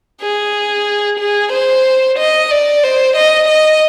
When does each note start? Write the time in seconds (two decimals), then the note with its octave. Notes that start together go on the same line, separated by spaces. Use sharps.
0.21 G#4
1.20 G#4
1.52 C5
2.19 D#5
2.51 D5
2.84 C5
3.17 D#5
3.48 D#5